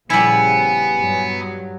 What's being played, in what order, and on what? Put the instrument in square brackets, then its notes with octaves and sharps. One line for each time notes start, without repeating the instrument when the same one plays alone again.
[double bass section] A#2 C#3 F3 [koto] G3 E4 [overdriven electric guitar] B3 [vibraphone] G#5
[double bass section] G2 F#3